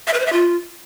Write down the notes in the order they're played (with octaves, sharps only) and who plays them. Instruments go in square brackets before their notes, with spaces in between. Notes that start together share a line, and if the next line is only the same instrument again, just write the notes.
[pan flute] E5
B4
C5
E5
F4